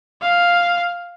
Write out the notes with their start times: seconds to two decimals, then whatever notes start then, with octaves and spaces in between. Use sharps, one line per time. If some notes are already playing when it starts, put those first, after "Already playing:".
0.21 F5